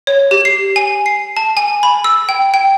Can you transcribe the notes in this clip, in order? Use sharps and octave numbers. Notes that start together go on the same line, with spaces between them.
C#5
G4
C7
G#5
C7
A5
G#5
B5
E6
G5
G5